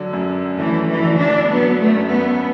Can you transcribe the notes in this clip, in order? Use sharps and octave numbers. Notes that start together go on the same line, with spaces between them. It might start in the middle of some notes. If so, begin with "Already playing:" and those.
Already playing: D3 F#3
F#2
E3 A3
E3
D3
D4
F#3 B3
A3
F#2
B3